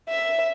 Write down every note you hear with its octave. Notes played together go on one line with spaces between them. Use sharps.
E5